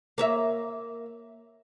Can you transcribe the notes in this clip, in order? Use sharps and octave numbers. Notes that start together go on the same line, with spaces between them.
A#3 C#5 E5